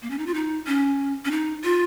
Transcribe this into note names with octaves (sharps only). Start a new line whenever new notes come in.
A#3
C#4
D#4
F4
D#4
C#4
C#4
D#4
F4